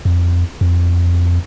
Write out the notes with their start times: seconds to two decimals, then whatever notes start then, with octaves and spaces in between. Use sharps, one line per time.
0.05 F2
0.61 F2